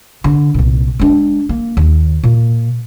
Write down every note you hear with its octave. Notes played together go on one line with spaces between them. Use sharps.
D3
C2 A#2
G#3 D4
A#3
D#2
A#2